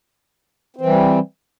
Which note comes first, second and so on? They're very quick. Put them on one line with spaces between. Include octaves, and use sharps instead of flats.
C4 E3 G3